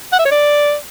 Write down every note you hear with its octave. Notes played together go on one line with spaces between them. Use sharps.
F#5
E5
C#5
D5